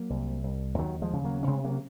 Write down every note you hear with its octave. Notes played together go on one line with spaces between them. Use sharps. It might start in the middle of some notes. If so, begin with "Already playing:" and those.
Already playing: F#3 A#3
C2
C2
D#2 D#3 F#3
F3 G#3
C#3
F#3 A#3
C#4
C3 G#3 C4
F#3 A#3